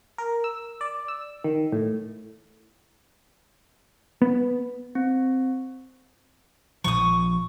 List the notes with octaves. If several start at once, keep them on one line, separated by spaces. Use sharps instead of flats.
A#4
E6
D5
E6
D#3
A2
B3
C4
A#1 F3 C#6 D#6